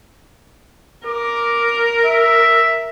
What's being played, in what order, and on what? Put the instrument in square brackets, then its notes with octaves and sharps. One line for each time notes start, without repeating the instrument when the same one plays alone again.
[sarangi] A#4 [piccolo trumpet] D6
[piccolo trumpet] E5